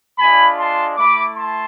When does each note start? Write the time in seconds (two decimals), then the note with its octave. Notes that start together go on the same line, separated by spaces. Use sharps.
0.19 G#3 D4 F4 G#5 B5
0.58 A5 C6
0.97 A3 E4 B5 D6
1.36 A5 C6